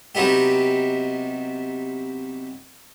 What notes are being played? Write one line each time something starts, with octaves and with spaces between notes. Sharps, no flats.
C3 F#3 B3 D#4 G4